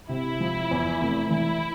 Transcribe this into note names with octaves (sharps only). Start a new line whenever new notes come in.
C3 E4
F3
E2
F1
E3 E4